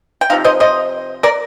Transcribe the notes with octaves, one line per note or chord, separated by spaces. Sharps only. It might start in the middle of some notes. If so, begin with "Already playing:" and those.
G5
C3 F3 C4 D#4 F5
C5 D#5
C5 D#5
A#4 D5